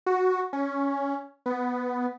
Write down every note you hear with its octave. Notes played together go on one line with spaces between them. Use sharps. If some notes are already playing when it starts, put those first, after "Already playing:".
F#4
C#4
B3